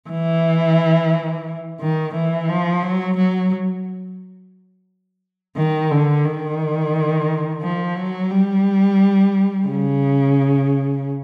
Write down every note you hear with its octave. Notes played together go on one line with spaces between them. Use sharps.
E3
D#3
E3
F3
F#3
F#3
D#3
D3
D#3
F3
F#3
G3
C#3